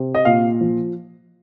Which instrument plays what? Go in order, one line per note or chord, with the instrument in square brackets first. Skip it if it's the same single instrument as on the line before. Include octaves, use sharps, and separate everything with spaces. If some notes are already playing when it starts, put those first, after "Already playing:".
Already playing: [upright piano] C3
D#5
A#2 F5
F3